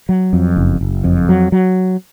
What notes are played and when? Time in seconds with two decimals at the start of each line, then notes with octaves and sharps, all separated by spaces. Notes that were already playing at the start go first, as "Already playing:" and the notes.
0.09 F#3
0.33 F2
0.56 F#1
0.81 F#1
1.04 F2
1.29 F#3
1.52 F#3